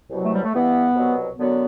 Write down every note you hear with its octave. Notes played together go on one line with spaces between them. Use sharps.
C2 B2 F#3
A3
G3
A3
G2 E3 B3
C2 B2 F#3
F#2 D3 F#3 B3